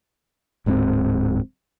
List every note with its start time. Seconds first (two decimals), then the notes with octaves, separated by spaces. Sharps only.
0.66 D1 G#2 A#3 C4